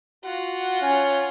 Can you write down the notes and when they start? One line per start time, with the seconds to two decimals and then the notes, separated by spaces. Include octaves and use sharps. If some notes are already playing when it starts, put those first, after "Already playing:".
0.25 F4 F#4 F#5
0.81 C#4 G#5